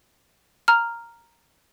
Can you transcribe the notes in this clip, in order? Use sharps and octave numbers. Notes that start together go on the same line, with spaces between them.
A#5 F6